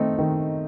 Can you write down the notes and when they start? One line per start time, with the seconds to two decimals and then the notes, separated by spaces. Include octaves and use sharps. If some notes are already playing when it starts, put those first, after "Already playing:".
Already playing: D#3 A3 C4 D#4
0.19 D#3